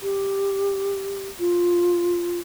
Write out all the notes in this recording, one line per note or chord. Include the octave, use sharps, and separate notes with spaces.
G4
F4